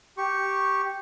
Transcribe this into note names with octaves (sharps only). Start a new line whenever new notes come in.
G4 C#6